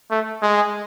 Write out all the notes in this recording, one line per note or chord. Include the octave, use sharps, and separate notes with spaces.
A3
G#3